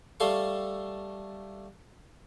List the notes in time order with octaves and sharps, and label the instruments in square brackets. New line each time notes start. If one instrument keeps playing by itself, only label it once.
[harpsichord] G3 A3 A4 F5 C6 C#6